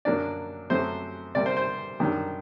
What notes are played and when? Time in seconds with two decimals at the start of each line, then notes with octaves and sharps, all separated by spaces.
0.05 F#2 F#3 A#3 D4 D5
0.70 F#2 F#3 A3 C4 C5
1.35 C3 G3 A#3 D5
1.46 C5
1.57 C5
2.00 F#2 D#3 G3 D4